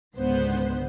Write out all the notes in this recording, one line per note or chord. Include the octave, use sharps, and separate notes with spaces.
C#2 G#2 D3 B3 C5